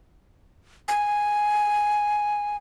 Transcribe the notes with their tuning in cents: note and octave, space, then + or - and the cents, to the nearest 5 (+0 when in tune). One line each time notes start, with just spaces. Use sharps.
G#5 +0